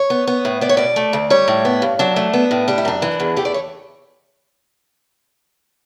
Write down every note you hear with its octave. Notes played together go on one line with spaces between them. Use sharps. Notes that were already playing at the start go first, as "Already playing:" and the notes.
Already playing: C#5
B3
B3
A2
B3 D5
C#5
B2 D5
A3
D2
G3 C#5
A2
B3
G2
F#3 D4
A3
B3
A2
G3 D4
E4
F#2 D4
E3
E2
A3 G4
D5
C#5